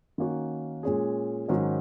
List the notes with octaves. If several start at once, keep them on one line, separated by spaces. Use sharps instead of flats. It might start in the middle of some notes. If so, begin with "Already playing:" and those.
D#3 A#3 C#4 F#4
A#2 G#3 C#4 G#4
G#2 D#3 F#3 C#4